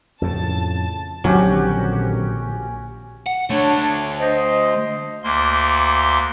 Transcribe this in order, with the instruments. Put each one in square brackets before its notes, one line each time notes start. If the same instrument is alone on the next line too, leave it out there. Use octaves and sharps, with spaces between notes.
[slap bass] F2 A2 C#3 [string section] A5
[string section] A#1 [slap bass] D3 D#3 C4 [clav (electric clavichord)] F#3 [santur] C#4 F#4 G4
[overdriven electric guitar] F#5
[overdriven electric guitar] D3 A3 [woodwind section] D4 C#5
[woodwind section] C5 D#5
[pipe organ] D2 A#3 C6